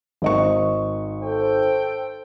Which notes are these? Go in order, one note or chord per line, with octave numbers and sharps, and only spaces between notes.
G#1 D#5 C#6
A4 C5 G5